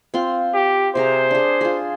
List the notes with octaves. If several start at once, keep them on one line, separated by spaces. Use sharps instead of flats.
C4 F4 C6
G4
C3 G#4 C5 A#5
D4 G#4
F4 G#4